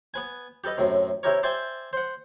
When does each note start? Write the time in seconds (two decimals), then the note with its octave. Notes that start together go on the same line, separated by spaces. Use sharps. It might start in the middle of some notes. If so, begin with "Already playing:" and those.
0.14 B3 B4 G#5
0.64 G4 A4 B4 D#5 B5
0.77 F#2 A2 C3
1.23 C3 E4 G4 A#4 C#5
1.43 C5 D5 E5 G5 G#5
1.93 C5 F#5